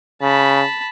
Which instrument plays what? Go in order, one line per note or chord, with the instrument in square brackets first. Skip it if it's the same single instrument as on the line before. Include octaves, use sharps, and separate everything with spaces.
[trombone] C#3 [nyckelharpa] A5 B5